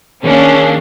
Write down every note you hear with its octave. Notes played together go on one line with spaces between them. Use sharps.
D#2 A#3 C#4 D4 G#4 A#4 C#5